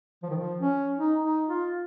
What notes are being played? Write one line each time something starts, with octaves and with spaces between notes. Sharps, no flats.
F3
D#3
F3
C#4
D#4
D#4
F4